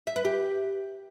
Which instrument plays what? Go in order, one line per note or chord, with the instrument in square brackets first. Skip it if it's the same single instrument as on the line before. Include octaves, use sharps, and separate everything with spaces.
[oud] E5
B4
G4